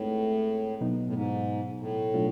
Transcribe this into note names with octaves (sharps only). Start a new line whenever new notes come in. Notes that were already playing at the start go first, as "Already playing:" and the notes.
Already playing: A2 G#3 C4 D#4 G#4 B4
B2 F#3 B3 D#4
A2
G#2
A2
B2 F#3 A3 D4 F4